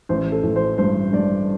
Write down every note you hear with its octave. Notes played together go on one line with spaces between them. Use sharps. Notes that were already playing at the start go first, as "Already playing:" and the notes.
A1 C5
A4
A1
C5
G2 C5
G2 D5